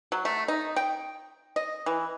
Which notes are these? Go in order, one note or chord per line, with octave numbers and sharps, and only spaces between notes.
F#3
A3
D#4
G5
D#5
E3